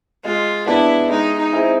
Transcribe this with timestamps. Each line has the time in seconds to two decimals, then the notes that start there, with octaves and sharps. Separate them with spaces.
0.24 G#3 F4
0.67 B3 D4 E4
1.09 G#3 D#4
1.38 D#4
1.53 C4 E4 G#4